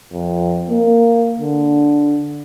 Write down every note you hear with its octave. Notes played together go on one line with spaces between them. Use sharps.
F2
A#3
D3